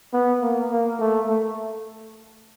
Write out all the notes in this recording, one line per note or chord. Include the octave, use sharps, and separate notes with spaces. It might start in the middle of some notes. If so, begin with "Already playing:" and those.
B3
A#3
A#3
A3
A3